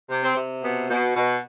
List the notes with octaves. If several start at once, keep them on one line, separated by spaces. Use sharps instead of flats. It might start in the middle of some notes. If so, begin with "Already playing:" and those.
C3
C4
C3
B2 B3
B2
B2